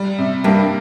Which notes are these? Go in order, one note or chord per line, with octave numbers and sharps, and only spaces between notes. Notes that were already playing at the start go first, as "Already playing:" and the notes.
Already playing: G3
C3
G2 A#3